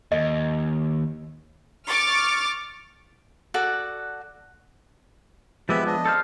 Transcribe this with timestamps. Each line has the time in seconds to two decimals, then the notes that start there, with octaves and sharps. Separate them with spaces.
0.12 D#2 D#5
1.89 C#6 D6 F6 A6
3.54 F#4 A4 D5 F#5
5.69 F3 G#3 B3 G4 B4 E5
5.87 D4 D#5
6.06 A4 C5 F5